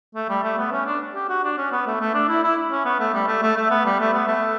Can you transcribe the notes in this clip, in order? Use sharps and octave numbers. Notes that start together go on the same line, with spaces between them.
A3
G3
A3
B3
C#4
D4
G4
F#4
D4
C#4
B3
A3
A3
D4
E4
E4
C#4
B3
A3
G3
A3
A3
A3
B3
G3
A3
B3
A3